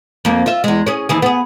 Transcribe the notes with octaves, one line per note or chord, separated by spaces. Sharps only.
F2 A#3
F4 E5
E2 G#3
C#4 G#4
D#2 E3 G#4
B3 G#4